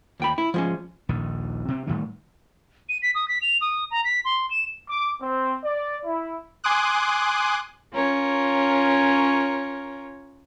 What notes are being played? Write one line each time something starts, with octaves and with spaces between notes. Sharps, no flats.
D#2 G5 B5
E4
F3 G#3 C#4
A#1 D#2 A#2 D#3
C3 C4
A2 D#3 G3 A3
D#7
B6
D#6
B6
F7
D#6
A#5
B6
C6
E7
D6
C4
D5
E4
G#5 C6 D6 D#6 F#6
C#4 F4 A#4 C#5